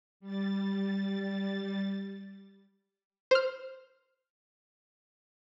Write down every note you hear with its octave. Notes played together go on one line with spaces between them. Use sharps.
G3 A6
C5 F6